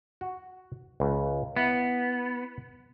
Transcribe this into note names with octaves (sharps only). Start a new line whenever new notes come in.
F#4
C#2
B3 E4